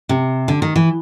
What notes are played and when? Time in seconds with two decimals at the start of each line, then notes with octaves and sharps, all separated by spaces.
0.09 C3
0.48 D3
0.62 D#3
0.76 E3